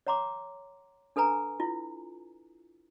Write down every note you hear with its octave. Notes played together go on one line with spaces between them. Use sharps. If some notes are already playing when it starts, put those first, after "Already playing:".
C#5 F#5 A#5 C6 D6
D4 A4 B4 G#5 A#5
E4 F4